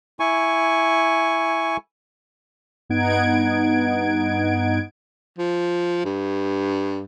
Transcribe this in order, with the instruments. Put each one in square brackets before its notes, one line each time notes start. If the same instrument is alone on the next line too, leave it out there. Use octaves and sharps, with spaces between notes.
[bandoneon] E4 G#5 C#6
[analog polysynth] G2 B3 D#4 F#5 G#6 D7
[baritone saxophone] F3
G2